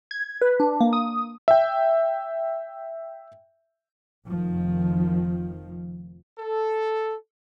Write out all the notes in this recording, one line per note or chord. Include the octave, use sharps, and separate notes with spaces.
G#6
B4
D4
A#3
D#6
E5 G5
F1 D#3 F3
A4